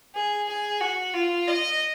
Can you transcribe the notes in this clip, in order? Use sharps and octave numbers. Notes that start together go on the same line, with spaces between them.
G#4
G#4
F#4
F4
D#5